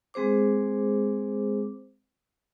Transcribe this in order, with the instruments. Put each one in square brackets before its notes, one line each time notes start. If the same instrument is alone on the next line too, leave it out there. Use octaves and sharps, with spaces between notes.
[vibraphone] G#3 C4 G#4 C5 D6